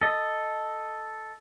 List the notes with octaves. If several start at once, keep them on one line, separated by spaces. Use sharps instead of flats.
A4 D#5